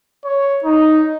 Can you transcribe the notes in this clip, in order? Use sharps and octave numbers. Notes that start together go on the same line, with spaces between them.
C#5
D#4